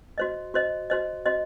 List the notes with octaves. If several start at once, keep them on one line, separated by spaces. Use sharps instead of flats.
F#4 C5 D#5
F#4 C5 D#5
F#4 C5 D#5
F#4 C5 D#5